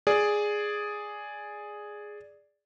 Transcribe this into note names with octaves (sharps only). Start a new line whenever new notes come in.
G#4 D5